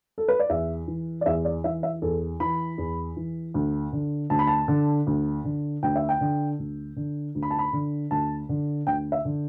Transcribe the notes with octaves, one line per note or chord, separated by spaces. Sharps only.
A4
B4
D5
E2 E5
E3
D5
E2 E5
D5
E3 E5
E5
E2 A4
E3 B5
E2
E3
D2
D3
D2 A5
B5
A5
D3
D2
D3
D2 G5
E5
G5
D3
D2
D3
D2
B5
A5
B5
D3
D2 A5
D3
D2 G5
E5
D3